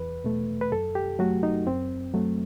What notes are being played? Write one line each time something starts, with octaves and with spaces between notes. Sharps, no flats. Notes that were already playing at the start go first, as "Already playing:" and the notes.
Already playing: E2 B4
B2 A3
B4
F#2 A4
G4
F#3 A3 F#4
D#4
F#2 C4
F#3 A3